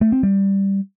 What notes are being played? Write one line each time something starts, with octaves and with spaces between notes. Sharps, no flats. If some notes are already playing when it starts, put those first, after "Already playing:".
A3
C4
G3